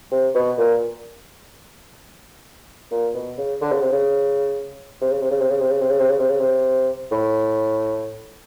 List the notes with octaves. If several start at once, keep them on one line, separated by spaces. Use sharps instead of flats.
C3
B2
A#2
A#2
B2
C#3
D3
C#3
C3
C#3
C3
C#3
C3
C#3
C3
C#3
C3
C#3
C3
C#3
C3
C#3
C3
C#3
C3
A2